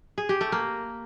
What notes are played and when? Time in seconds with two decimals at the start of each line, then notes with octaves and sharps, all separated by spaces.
0.18 G#4
0.29 G4
0.41 A3
0.52 A#3